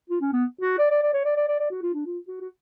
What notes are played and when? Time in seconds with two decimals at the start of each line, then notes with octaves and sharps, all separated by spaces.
0.10 F4
0.21 C#4
0.33 B3
0.61 F#4
0.79 D5
0.90 D5
1.02 D5
1.13 C#5
1.25 D5
1.36 D5
1.48 D5
1.60 D5
1.71 F#4
1.83 F4
1.94 D4
2.06 F4
2.28 F#4
2.41 F#4